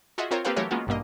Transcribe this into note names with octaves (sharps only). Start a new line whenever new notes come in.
F4 F#4 G#4 D#5 E5
C4 F4 A#4 C5 C#5
A#3 C4 G4 A4 B4 F5
E3 F#3 A3 G4 A#4 C#5
G#3 A#3 B3 C#4 F4 F#4
A1 G2 B2 A#3 D#5